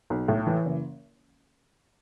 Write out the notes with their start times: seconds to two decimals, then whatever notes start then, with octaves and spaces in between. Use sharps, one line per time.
0.10 B1
0.28 A2
0.47 E3
0.66 F#1